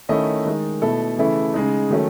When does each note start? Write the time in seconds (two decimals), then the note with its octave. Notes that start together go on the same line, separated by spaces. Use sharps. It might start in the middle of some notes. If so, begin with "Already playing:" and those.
0.09 D#3 A3 C#4 E4 D#5
0.45 D#3 G#3 D#4
0.81 B2 A3 E4 A4
1.18 C#3 E3 A3 E4
1.54 C#3 G#3 D#4
1.91 D#3 F#3 A3 C#4